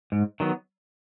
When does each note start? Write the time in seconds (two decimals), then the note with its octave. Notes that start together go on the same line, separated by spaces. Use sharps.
0.12 G#2
0.40 D#3 F#3 B3